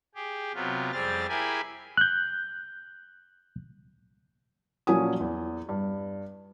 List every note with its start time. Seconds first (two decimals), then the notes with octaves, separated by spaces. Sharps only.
0.15 G4 G#4
0.54 C3 F#3 B3 F4
0.92 F2 G3 C4 G#4 F6 A6
1.29 E4 G4 G#4 A#4 G#5 B5
1.97 F#6 G6
4.87 A#2 F3 F#3 C#4 G#5 D#6
5.21 E2
5.69 G2